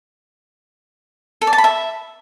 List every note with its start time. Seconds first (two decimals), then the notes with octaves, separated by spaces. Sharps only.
1.41 A4
1.47 D5
1.53 A5
1.58 B5
1.64 E5